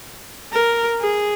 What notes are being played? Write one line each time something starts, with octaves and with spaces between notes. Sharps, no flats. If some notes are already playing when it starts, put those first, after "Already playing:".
A#4
G#4